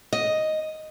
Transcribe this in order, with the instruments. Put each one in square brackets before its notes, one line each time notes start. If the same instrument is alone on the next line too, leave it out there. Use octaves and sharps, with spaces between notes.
[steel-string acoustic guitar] D#5